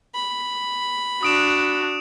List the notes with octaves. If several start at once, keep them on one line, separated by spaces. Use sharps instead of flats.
B5
D4 F#4 D#6 D7 E7